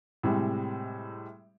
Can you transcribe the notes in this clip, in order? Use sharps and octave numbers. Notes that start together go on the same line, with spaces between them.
A2 C3 G3 G#3